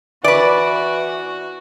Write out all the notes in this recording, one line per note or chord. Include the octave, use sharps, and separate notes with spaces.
E3 F#4 B4 D5